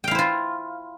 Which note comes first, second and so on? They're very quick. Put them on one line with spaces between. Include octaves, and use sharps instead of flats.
G5 F5 E4 C5 F4